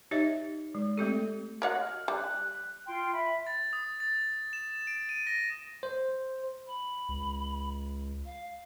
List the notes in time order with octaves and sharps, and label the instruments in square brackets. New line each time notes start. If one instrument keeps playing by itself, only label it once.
[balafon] D#4 G4 C#5 D#5 E5
G#3
A3 C4 G4 A4
[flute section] F#4 D#5 [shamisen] A#4 C#5 F#5
[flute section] F6
[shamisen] G3 [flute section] F#6
[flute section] F4 G5 C6
E5 B5
[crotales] A6
D#6
A6
E7
D7
D#7
A#6
[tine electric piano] C5
[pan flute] B5
[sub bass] C#2
[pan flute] F5